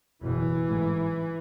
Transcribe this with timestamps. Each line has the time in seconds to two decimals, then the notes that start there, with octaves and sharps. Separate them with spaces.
0.22 F#1 E2 B2 E3
0.67 A1 G#2